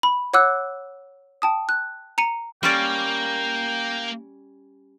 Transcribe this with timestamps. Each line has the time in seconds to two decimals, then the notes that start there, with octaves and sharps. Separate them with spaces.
0.03 B5
0.34 C#5 F#5 D6 E6 F#6
1.42 G5 A5 D#6
1.69 F#6
2.18 A#5 C#7 D#7
2.63 G3 A#3 C#4 D5 G5